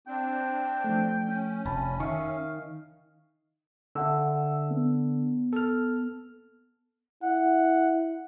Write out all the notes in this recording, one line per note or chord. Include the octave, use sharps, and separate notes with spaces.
C4 D4 G5
F3 A3
C#4
F1 G#5 A5 B5
D#3 E5 F5 C#6
D3 D4 E5 F#5 E6
B3
A4 F6
E4 F#5